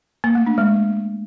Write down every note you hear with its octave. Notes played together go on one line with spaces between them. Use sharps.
A#3
A3
D4
G#3